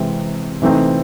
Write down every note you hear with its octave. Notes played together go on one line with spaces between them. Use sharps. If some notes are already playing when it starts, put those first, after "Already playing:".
Already playing: C3 E3 G#3 C4
C3 E3 A3 C4 D#4